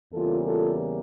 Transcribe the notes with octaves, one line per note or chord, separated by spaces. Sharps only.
E2 C#3 G3 A#3 F4 A4
F4 A4